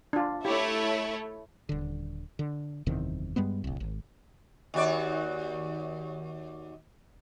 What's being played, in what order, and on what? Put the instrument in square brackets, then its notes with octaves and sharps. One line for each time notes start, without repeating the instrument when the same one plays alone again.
[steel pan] D4 F4
[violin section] A3 E4 C#5 [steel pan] G4
[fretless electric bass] D#1 D3
D3
F#1 E2 C3 D#3
G2 G3 G#3 B3
D1 C2
G#1
[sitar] D#2 F#4 D5